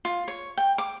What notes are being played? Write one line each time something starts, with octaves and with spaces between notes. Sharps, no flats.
F4
C#5
G5
D6